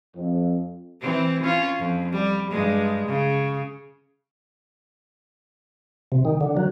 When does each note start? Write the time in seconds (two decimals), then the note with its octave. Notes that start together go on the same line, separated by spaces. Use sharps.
0.16 F2
1.01 E3 C4
1.44 C#4 F4
1.79 F2
2.12 G3
2.51 G2 G#3
3.07 C#3
6.12 C3
6.25 D#3
6.41 D3
6.57 F#3